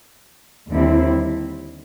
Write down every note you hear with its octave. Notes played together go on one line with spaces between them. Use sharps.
D#2 D3 G3 C4 E4